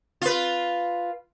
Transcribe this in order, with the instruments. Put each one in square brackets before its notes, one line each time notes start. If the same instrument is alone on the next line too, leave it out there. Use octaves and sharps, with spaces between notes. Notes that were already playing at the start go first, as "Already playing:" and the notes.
[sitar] F4 B4